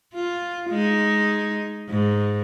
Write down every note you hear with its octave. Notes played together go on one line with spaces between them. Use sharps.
F4
G#3 D#4
G#2